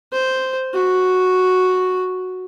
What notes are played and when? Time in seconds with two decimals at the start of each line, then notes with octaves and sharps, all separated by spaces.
0.12 C5
0.74 F#4